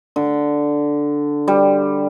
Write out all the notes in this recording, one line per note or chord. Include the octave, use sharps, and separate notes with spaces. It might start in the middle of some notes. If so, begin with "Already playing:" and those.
D3
G3